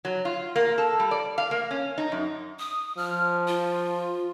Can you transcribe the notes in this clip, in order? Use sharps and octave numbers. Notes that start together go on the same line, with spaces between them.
F#3
F4
A#3
A4
G3
D5
F5
A#3
C#4
D#4
F#2
D#6
F3 F6
F4